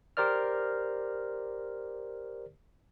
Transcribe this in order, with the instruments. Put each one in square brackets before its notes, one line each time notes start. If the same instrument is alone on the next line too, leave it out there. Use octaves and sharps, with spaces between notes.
[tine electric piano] G4 A#4 C5 D5 F6